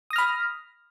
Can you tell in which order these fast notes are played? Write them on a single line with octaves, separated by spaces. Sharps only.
D#6 A#6 F6 B5